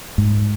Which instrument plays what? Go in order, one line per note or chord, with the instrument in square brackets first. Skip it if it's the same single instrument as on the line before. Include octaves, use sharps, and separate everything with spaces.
[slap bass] G#2